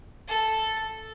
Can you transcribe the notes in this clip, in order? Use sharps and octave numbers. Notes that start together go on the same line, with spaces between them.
A4